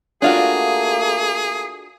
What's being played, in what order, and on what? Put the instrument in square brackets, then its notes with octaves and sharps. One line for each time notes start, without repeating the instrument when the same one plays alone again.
[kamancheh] A3 A#3 [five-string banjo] D4 F4 F#4 [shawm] G#4